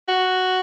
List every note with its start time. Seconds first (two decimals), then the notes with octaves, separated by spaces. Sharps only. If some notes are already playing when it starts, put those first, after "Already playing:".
0.08 F#4